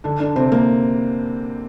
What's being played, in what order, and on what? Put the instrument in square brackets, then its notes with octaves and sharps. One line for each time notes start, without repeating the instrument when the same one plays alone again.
[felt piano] D3 D4
D3 D4
C3 C4
A#3